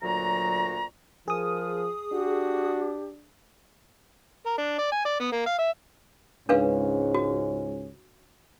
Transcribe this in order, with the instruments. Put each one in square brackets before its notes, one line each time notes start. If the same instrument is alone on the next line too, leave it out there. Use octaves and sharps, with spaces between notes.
[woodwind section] D2 A#2 F#3 F#4 A#5
[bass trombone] F3 [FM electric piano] G#4 D#6 [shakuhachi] A#4
[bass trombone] D4 [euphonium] F#4 [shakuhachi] G4
[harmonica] A#4
D4
D5
G#5
D5
B3
A#3
F5
E5
[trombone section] C#2 G#2 C#4 [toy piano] D4 B4 F5
[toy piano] F#4